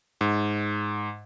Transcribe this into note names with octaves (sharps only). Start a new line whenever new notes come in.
G#2